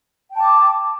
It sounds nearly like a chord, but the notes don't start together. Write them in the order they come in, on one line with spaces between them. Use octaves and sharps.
G5 A5 D6